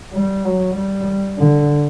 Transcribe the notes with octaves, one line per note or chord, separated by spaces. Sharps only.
G3
F#3
G3
D3